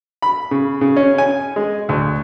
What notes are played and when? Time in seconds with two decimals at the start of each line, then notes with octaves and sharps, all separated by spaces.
0.22 B5
0.51 C#3
0.81 C#3
0.96 C#4
1.18 G#5
1.56 G#3
1.89 D2